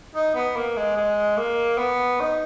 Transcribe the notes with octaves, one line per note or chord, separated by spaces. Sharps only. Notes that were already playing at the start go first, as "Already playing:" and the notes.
D#4
B3
A#3
G#3
G#3
A#3
B3
D#4